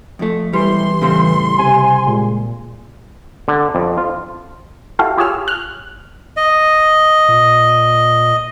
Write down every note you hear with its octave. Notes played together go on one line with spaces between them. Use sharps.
F2 A3
E1 E3 G3 C6
A2 C#3 G3 C4
C3 G#5
A#2 G#3
D3
F2
F4
E4 F#4 G4 A4 F5
F4 G4 G#4 C#5 E6 F6
F6 F#6
D#5
A#2